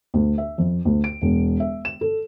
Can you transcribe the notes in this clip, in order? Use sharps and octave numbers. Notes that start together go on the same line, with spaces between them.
D2
E5
F2
D2
D7
E1
E5
E7
A4